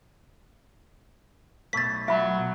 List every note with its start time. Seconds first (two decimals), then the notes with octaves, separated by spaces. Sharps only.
1.73 B1 B2 A3 A6 B6
2.08 F#3 E5 B5